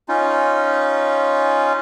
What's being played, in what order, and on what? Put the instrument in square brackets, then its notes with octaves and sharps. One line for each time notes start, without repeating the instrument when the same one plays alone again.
[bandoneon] C#4 D#4 F4